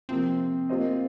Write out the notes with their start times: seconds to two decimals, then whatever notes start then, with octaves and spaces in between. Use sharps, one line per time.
0.09 C3 F3 A#3 C4
0.69 A#3 F4 C5 D#5